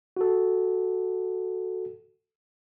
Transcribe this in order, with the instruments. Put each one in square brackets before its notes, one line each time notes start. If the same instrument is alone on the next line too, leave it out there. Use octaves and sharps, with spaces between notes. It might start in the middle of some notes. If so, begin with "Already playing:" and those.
[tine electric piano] F#4 A4